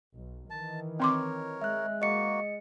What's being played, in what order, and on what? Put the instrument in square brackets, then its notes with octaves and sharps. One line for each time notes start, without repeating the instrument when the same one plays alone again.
[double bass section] B1
[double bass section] D#3 E3 [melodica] A5
[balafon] C4 C6 D6 [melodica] A#4 C#5
[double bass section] G#3 [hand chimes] E5 F#6
[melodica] A#3 F#4 [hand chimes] D#5 C#7